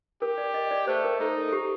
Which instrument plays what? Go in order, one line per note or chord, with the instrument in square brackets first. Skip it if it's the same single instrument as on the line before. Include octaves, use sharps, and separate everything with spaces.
[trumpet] G4 [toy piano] A#4
[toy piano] D5
D#5
D5
[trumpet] A3 [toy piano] C5
[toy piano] A#4
[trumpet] D#4 [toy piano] A4
[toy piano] A4
G4